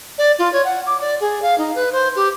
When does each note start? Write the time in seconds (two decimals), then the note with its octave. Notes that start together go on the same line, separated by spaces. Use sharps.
0.18 D5
0.39 F4
0.53 C#5
0.65 F#5
0.86 D6
1.01 D5
1.21 G#4
1.42 F5
1.58 D#4
1.75 B4
1.92 C5
2.16 G4